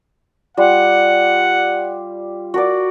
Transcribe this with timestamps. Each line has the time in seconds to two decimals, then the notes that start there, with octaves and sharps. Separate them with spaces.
0.57 G3 F4 F#5
2.54 F#4 A#4 D5